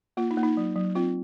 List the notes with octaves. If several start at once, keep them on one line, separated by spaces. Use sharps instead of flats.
A#3 F4
D#4
A#3
D#4
F#3
F#3
C4 F4